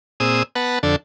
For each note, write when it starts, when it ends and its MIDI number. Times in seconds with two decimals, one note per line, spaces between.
0.20 0.43 46
0.20 0.43 60
0.20 0.43 68
0.20 0.43 87
0.20 0.43 88
0.55 0.79 59
0.55 0.79 71
0.55 0.79 78
0.55 0.79 81
0.83 0.96 41
0.83 0.96 50
0.83 0.96 62
0.83 0.96 69